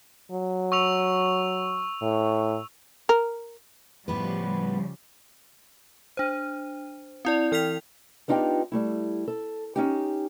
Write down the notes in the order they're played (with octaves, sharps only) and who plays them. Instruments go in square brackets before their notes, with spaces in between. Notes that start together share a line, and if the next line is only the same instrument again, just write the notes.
[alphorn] F#3
[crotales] C#6 E6 F7
[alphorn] A2
[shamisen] A#4
[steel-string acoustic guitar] A2 B3 B4 [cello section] C#3 F3 G3
[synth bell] D4 C5
C4 E4 D5
E3 G5 F6 B6 F7
[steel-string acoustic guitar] B3 D4 D#4 F4 G4 G5
G3 A3 E4
A4
C#4 D#4 G4